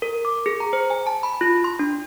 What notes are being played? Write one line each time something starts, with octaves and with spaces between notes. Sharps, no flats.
A#4
D6
G#4
A#5
C5
G#5
A5
B5
F4
C6
D4